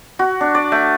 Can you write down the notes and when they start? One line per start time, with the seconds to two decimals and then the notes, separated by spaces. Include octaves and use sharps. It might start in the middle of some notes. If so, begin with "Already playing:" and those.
0.19 F#4
0.41 D4
0.55 D5
0.72 A3